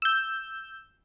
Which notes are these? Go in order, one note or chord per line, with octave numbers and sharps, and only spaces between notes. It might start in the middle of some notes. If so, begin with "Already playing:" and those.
E6 G6